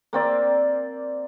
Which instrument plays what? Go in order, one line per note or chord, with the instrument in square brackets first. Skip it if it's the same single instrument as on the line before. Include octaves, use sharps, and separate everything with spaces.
[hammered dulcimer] A#3 C4 D5